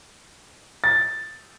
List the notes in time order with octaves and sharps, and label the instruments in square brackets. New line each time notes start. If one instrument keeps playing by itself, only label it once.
[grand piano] A6